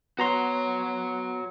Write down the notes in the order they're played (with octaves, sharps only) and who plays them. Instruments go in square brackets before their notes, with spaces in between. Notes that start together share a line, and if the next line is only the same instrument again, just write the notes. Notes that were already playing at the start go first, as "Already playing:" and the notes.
[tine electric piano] B3 A#5 C6 [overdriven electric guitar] F#4 C#5